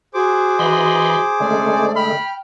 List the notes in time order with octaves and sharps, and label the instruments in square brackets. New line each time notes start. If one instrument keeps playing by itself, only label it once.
[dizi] F#4 [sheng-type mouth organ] G#4 C5 D6
[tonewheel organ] E3 B5 C6 [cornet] D#5
[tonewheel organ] D3 G#3 A3 [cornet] C#4 [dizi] D5
[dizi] G5 [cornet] B5 [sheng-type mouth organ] F6